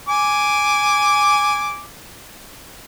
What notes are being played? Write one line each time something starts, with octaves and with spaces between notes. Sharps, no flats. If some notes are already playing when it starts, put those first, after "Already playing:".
G#5 D6